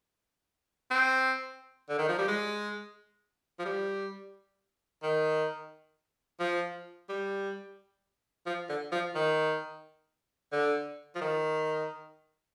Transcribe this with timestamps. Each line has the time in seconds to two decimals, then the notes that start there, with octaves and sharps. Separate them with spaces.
0.91 C4
1.89 D3
1.99 D#3
2.09 F3
2.19 G3
2.28 G#3
3.59 F3
3.65 G3
5.03 D#3
6.40 F3
7.09 G3
8.46 F3
8.69 D3
8.92 F3
9.15 D#3
10.52 D3
11.15 F3
11.21 D#3